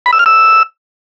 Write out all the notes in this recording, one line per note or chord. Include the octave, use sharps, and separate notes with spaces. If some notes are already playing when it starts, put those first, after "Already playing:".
B5
E6
F6
E6